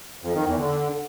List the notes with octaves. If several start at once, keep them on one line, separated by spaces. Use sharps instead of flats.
F2
D#3
E2
D3